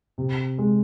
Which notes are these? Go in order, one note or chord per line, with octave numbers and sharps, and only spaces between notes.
C3
G#3